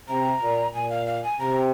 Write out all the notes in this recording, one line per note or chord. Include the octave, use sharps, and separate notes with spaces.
C3 A#5
A#2
A#2 G#5
F5
F5
G#5
C3 A#5